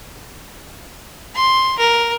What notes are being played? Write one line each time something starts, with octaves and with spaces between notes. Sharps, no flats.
C6
A#4